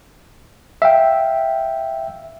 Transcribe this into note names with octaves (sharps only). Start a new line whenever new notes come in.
E5 F5 G5